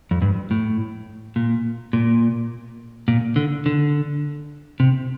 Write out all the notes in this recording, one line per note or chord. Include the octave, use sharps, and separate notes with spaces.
F2
G2
A2
A#2
A#2
A#2
D3
D3
C3